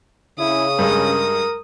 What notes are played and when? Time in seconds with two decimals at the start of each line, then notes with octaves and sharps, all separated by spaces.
0.39 C#3 E4 D#6
0.79 G2 G#3 A#4